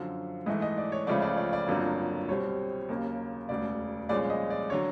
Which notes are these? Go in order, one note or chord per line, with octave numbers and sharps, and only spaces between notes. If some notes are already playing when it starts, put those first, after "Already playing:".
Already playing: F#2 D3 F3
G#2 E3 A3 D#5
D#5
D5
C#5
C#2 C#3 F3 A3 C#4 D5
D5
D5
D5
G1 F2 D3 F#3 A#3
C2 B2 G3 C4 C#5
D#2 C#3 F#3 A#3
E1 D2 C#3 D5
C2 A#2 F3 G#3 C#4 D5
D#5
D5
D3 F#3 C#5